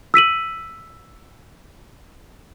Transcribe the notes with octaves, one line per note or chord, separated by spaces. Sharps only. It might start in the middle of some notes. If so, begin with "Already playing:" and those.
E6 B6 D#7 F#7